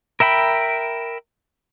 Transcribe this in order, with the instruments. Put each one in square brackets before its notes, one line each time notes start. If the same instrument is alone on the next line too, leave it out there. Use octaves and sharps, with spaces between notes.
[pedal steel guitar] A#4 E5 G5 B5